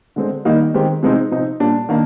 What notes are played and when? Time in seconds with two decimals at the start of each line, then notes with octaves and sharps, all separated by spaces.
0.16 D3 G#3 C4
0.45 D#3 G3 A#3 D#4
0.74 D#3 G#3 C4 G4 C5
1.03 C3 F3 G#3 C4 D#4
1.32 C3 F3 C4 D#4
1.60 A#2 G3 D4
1.89 D#3 A#3 D4